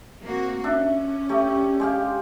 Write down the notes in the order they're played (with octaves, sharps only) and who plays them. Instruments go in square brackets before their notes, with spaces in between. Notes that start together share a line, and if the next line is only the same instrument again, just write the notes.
[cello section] A#3 C4 F#4
[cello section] C#4 [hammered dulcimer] D4 E5
[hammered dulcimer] A3 G4
G#3 G4 F5